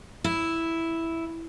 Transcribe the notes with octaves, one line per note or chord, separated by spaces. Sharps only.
E4